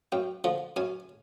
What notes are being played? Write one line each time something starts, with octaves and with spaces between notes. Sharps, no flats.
F#2 G5
D3 F3
F#2 G#5